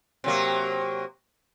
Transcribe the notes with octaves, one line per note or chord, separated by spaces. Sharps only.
C3 F#3 A#3